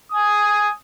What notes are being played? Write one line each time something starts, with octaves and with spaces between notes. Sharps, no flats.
G#5 D#6